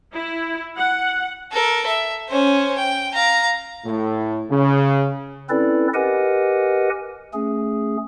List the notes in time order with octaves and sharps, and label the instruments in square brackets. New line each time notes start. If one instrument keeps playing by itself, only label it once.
[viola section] E4
F#5
[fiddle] A4 A#4
E5
C#4 C5
G5
F5 A#5
[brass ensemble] A2
C#3
[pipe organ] C4 C#4 E4 A4 B4 D5
G4 A#4 B4 D#5 F#5 G#5
A3 C#4 G#4